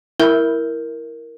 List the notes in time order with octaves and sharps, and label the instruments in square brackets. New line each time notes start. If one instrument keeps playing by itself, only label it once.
[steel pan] E4 [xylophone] A#4 G6